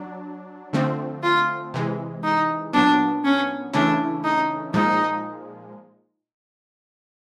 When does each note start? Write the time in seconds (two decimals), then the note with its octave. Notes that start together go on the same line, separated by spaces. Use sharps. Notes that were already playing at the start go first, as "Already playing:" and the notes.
Already playing: F#3 D4
0.73 D3 F3 A3 C4
1.24 F4
1.74 C3 E3 G#3
2.24 D#4
2.73 A#2 F#3 B3 D4
3.25 C#4
3.73 C#3 E3 A3 C#4 D4 E4
4.24 D#4
4.74 A#2 F3 G#3 D#4